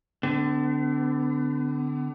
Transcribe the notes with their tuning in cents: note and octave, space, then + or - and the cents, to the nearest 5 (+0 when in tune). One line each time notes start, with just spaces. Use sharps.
D3 +0 B3 +45